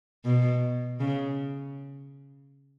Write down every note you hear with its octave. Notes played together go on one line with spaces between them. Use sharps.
B2
C#3